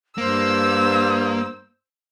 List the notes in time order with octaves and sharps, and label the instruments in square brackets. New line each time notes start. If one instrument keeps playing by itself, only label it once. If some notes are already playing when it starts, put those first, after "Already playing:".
[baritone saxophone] G2 [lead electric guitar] A#3 [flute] C5 [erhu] E6